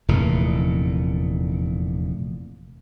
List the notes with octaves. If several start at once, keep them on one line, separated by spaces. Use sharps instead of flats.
F1 E2 A#2